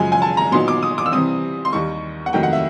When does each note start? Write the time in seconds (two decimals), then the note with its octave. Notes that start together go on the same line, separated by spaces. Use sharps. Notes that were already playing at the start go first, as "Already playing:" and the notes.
Already playing: F#2 C#3 F3 G#3 G#5
0.12 G#5
0.22 A5
0.37 A#5
0.52 A#2 F#3 B3 D#4 C6
0.68 D6
0.83 D#6
0.98 D6
1.06 E6
1.12 C3 E3 G3 C4 D#6
1.65 C6
1.73 D#2 D#3 G3 C#6
2.26 F#5
2.33 F2 C3 D#3 F#3 A3 G5
2.43 F#5
2.53 E5